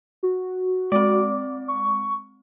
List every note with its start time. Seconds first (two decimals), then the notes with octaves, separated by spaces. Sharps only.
0.23 F#4
0.92 G#3 C4 D5
1.68 C#6